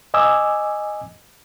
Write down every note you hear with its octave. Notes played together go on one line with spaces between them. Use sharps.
D#5 G#5 D6 E6